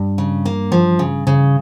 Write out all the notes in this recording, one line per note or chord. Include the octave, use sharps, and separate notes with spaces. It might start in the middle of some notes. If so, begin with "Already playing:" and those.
Already playing: G2
C#3
A#3
F3
C#3
C#3